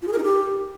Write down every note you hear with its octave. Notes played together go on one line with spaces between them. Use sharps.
F4
G#4
A#4
D#4
G4